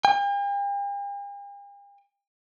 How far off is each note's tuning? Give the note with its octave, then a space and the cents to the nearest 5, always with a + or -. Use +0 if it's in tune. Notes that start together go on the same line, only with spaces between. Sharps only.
G5 +45